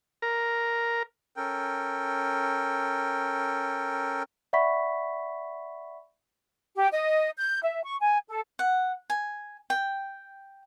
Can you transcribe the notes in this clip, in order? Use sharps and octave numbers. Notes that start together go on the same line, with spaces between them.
A#4
C#4 A4 A#4 G5
D5 E5 F#5 B5 C#6 B6
G4
D#5
G6
E5
C#6
G#5
A4
F#5
G#5
G5